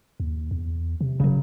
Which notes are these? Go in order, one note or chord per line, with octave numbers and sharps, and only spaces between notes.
D#2
E2
C3
D#1 C#3 F#3